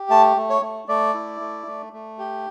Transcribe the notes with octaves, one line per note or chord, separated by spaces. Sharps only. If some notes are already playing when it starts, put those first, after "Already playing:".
Already playing: G4
A3 A5
A3
C#5
A3
A3 D5
E4
A3
A3
A3
G4